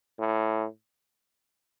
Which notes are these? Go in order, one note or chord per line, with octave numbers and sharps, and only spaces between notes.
A2